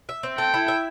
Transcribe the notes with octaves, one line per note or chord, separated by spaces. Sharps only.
E5
C4
A4 G5
E4
E5